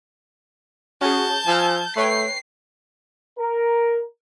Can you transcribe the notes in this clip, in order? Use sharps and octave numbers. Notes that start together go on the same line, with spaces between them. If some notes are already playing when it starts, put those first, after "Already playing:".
C#4 F#4 G#4 A5 G6
F3 G#5 E6 F6
A3 B4 C#5 G5 C7
A#4